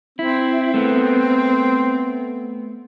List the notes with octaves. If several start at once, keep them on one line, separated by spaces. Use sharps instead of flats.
C4 E4
A3 B3